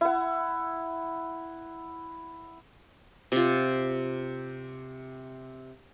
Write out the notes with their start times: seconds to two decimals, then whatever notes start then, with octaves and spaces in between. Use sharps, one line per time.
0.01 E4 F#5
3.32 C3 F4